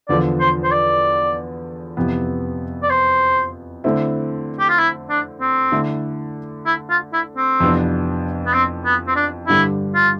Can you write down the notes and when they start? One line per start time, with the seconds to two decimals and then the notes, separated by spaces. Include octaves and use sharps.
0.09 E2 D3 F3 D5
0.40 C5
0.64 C5
0.71 D5
1.97 F2 C3 E3 B3
2.83 D5
2.90 C5
3.84 D3 A3 C4 E4
4.60 G4
4.69 F4
4.79 E4
5.10 D4
5.41 C4
5.72 D3 A3 E4
6.66 E4
6.90 F4
7.13 E4
7.37 C4
7.60 F2 C3 E3 B3 D4
8.46 B3
8.53 C4
8.85 B3
9.07 C4
9.16 D4
9.47 G2 D3 G3 E4
9.95 F4